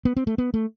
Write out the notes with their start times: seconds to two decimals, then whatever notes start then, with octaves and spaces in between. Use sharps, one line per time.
0.05 B3
0.17 C4
0.27 A3
0.38 B3
0.54 A3